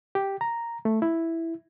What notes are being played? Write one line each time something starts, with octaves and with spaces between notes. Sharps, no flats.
G4
A#5
A3
E4